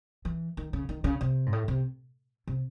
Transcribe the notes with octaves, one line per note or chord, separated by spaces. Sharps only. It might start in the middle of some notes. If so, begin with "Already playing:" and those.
E3
D#3
C#3
D#3
C#3
C3
G#2
A2
C3
C3